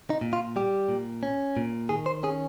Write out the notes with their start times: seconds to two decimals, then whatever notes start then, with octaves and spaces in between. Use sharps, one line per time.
0.10 D#4
0.21 A#2
0.33 F4
0.56 G3 G4
0.89 A#2
1.23 C#4
1.57 A#2
1.89 D#3 G#4
2.06 C5
2.23 C#4 G#4